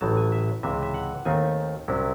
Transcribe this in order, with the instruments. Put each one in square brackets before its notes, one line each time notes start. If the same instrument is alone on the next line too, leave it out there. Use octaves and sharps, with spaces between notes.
[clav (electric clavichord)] A1 A2 F#3 A5
G#5
E5
C#2 C3 E3 E5
E5
F#5
D#2 D#3 A3 C4 G#5
C2 C3 F#3 C#4 E4